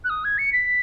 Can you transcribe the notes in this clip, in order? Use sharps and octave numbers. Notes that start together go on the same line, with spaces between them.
F#6
D#6
G#6
C#7
B6